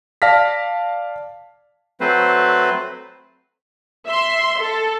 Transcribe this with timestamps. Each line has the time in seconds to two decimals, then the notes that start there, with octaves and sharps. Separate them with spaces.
0.22 D5 F5 A5 F6 A#6 B6
2.01 F#3 A3 C4 B4 C5
4.08 E5 C6
4.60 A4